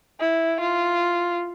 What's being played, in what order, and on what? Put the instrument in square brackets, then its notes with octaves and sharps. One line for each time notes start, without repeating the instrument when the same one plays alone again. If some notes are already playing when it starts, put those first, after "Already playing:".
[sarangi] E4
F4